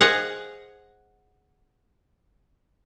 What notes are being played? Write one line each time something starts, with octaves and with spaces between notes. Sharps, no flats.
G#4 C5 D#5 F5 F#5